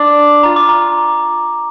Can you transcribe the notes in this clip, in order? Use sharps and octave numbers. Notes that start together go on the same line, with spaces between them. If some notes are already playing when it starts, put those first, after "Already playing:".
Already playing: D4
F4 A#5
D6
A#5